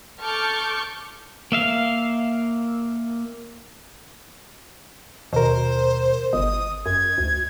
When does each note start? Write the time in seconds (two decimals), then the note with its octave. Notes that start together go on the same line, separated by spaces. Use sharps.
0.20 A4 A5 C#6 D6 F6 G6
1.52 A#3 E5 F5
5.33 D#2 B2 A#4 C5
6.33 G1 D#5 D#6
6.86 F#2 G#6
7.18 D2